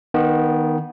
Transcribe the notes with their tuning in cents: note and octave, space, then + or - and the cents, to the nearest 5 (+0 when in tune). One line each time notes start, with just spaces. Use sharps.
D#3 +0 B3 -25